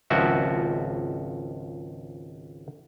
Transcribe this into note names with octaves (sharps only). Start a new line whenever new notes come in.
G#1 C#2 F3 E4 F#4 E5